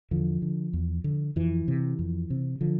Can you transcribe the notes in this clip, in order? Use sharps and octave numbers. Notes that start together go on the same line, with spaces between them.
E2 D3 F3
D3
E2
D3
F2 E3
C3
F2
C3
D3 F3